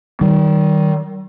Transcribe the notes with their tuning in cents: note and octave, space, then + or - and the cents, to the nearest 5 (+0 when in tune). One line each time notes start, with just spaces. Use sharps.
D#3 +0 G3 -35